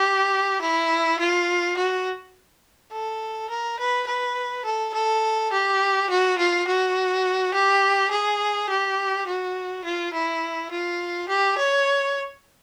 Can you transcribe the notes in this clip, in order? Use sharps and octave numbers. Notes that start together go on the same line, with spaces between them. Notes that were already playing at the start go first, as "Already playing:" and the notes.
Already playing: G4
E4
F4
F#4
A4
A#4
B4
B4
A4
A4
G4
F#4
F4
F#4
G4
G#4
G4
F#4
F4
E4
F4
G4
C#5